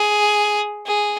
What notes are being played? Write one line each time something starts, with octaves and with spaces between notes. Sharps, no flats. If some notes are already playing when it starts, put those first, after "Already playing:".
Already playing: G#4
G#4